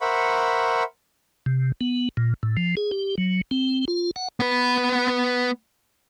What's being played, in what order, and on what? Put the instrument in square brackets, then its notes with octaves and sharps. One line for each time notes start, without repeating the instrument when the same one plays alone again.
[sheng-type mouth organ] A#4 C5 E5 F#5 B5 C#6
[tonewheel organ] C3
B3
A#2
A2
F3
G#4
G4
F#3
C4
F4
F#5
[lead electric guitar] B3 B4